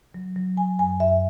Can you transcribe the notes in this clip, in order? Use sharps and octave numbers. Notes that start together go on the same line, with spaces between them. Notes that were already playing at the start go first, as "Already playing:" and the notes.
F#3
F#3
F#3 G#5
F#2 G#5
F#2 E5